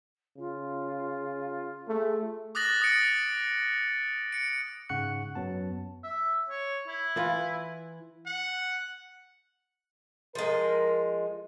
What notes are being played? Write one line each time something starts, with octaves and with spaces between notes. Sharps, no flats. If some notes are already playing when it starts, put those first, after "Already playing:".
C#3 F4
A3 G#4
D6 D#6 F#6 A6 A#6 F#7
D#6 A6 A#6 C#7 D7
C#7 D7
G#2 C#3 F#5 C#6 F#6 C#7
F#2 F#3 B3 A5
E5
C#5
E4
E3 F4 B4
F#5
F3 G#3 A#4